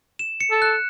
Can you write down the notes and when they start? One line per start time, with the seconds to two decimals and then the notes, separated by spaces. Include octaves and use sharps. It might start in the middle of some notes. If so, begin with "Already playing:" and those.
0.19 E7
0.41 C#7
0.51 A4
0.62 F#6